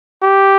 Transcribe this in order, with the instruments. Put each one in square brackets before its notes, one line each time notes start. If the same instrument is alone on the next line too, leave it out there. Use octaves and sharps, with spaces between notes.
[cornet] G4